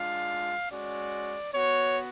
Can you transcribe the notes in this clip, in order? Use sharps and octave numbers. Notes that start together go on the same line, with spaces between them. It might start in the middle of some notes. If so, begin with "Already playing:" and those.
Already playing: G#3 D4 F4 F5
G#3 C#4 F#4 D5
B3 F#4 C#5